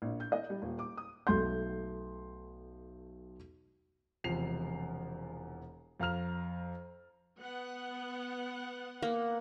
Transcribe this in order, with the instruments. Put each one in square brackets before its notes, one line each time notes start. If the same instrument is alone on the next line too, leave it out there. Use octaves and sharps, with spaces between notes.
[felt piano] A#1
G6
D#5
G3
D#1
D6
D#6
B1 A3 C6 G6
[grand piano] E1 E2 C3 F3 C7 F7
F2 F5 A#5 F6 F7
[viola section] B3 F#5
[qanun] A#3